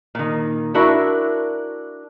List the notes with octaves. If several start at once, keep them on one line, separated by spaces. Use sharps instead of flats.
A#2 D#3
D4 E4 F#4 A#4 E5